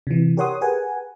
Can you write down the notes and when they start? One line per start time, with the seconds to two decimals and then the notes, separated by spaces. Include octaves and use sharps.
0.07 C3 E3
0.37 G4 A#4 C#5 F#5 C6 D#6
0.61 G4 G#4 A#4 B4 F#5 G#5